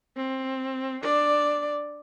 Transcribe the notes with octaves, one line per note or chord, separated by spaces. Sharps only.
C4
D4 D5